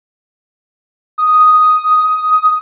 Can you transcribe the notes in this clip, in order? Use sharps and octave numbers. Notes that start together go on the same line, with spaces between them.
D#6